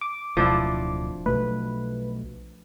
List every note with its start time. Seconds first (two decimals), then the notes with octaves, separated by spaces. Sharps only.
0.01 D6
0.37 D1 B2 F3 D4 E4
1.26 B1 B2 A3 B4